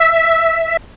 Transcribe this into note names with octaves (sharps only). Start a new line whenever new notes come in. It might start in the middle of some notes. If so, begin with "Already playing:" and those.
Already playing: E5